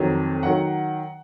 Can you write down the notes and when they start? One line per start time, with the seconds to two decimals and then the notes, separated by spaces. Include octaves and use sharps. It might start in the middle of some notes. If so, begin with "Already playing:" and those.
Already playing: F2 D#3 F#3
0.43 D#3 F#3 F#5